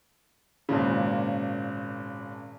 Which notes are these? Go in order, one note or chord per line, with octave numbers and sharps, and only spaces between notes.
G#1 A#2 C#3